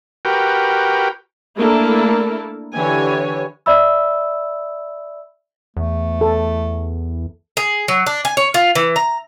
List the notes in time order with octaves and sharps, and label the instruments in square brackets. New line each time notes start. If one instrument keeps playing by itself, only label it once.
[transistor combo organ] F#4 G4 A#4 B4 G5
[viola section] A3 A#3 D4 E4 A4 A#4
D3 E3 G4 C#5 G#5
[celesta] D5 E5 B5 E6
[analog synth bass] E2 [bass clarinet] A3
[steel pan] A4
[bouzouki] G#4
F#3
D4
G#5
C#5
F4
E3
A#5